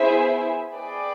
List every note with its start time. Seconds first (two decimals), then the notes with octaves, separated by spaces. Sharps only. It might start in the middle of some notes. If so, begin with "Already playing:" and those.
Already playing: B3 E4 G#4 C5 E5
0.74 G#4 B4 D5 G5